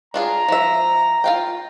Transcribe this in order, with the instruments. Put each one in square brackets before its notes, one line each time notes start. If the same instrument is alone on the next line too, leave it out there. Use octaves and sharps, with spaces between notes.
[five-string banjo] D4 F4 G#4 [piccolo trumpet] A#5
[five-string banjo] F3 E5
F4 F5 G5